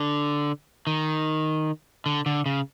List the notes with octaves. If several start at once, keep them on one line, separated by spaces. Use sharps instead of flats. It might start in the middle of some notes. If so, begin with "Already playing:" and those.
Already playing: D3
D#3
D3
D3
C#3